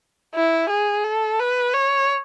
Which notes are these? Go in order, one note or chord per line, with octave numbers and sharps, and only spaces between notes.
E4
G#4
A4
B4
C#5